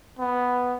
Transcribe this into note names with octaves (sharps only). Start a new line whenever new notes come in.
B3